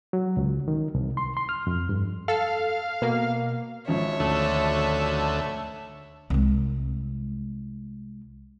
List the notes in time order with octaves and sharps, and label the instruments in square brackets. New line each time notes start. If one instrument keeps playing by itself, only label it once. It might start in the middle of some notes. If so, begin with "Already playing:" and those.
[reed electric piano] F#3
C#2
D#3
C2
C6
C6
F6
F2
G2
[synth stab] A4 [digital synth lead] F5
[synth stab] B2 A#3
[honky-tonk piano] G#1 F3 C#4 [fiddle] C#5 E5
[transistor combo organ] D2 A3
[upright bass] C2 G#3